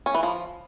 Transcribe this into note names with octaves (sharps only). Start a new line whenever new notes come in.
C#4
E3
F3